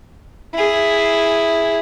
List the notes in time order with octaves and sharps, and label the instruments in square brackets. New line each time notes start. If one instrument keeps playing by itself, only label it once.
[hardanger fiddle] E4 G#4